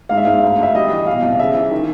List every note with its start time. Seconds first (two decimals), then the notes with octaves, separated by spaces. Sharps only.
0.09 G#2 F5
0.17 E5
0.25 G#2 F5
0.43 D2
0.58 D2 E5
0.75 G3 D#5
0.91 E3
1.06 B2 F5
1.22 C2
1.39 C#3 E5
1.56 E3
1.71 D#3